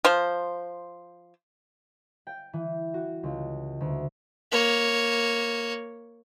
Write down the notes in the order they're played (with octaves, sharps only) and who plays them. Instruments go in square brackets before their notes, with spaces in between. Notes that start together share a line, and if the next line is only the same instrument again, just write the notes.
[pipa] F3 C5
[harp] G5
E3
F#4
C#2
D2
[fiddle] A#3 C#5